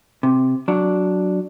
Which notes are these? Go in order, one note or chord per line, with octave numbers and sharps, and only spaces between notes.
C3
F#3 D4